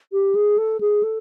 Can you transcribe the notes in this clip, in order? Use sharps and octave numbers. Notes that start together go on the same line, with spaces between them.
G4
G#4
A4
G#4
A4